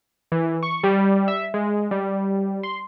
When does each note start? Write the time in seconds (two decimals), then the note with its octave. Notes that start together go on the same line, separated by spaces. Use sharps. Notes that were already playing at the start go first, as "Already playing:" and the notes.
0.32 E3
0.63 C#6
0.83 G3
1.28 E5
1.54 G#3
1.91 G3
2.63 C6